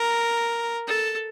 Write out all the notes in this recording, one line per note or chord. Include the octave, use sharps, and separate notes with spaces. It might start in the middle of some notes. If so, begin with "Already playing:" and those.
Already playing: A#4
A4